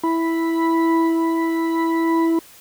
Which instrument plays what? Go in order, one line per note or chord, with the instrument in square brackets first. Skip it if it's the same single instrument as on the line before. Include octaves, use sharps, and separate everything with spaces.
[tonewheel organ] E4 B5